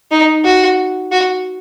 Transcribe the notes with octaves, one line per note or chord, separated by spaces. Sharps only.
D#4
F#4
F#4